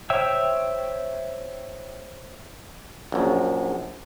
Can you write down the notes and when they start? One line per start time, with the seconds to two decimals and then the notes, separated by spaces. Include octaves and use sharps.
0.10 C5 C#5 E5 G5 E6
3.12 A#1 F#2